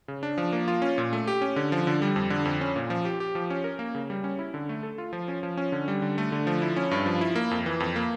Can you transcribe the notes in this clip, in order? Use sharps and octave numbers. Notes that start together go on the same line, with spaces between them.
C#3
D4
F3
A#3
F4
C#4
A#2
A3
G4
C#4
D3
F3
D3
G3
F2
D3
F2
C#4
A#2
F3
G4
G4
F3
C#4
A#4
A#3
C#3
G3
C#4
E4
D3
A3
A4
F4
F3
C#4
F3
C#4
D3
G3
D3
A3
D3
F3
E4
C#4
G2
F3
E4
A#3
F2
E3
F2
A#3